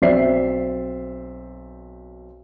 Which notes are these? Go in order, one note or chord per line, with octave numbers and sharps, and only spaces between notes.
B1 C4 D5 E5 C7